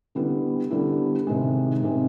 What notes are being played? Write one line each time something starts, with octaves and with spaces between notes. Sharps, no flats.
D3 G3 B3 E4
D3 G3 B3 E4
C3 D#3 G#3
C3 D#3 G#3